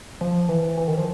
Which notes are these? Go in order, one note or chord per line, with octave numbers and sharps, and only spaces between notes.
F3
E3
E3
E3
D#3
F3